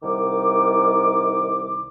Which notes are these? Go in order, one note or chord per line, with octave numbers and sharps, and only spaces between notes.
C2 D#3 D6